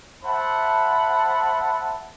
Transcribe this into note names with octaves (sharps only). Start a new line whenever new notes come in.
C5 E5 F#5 A5 B5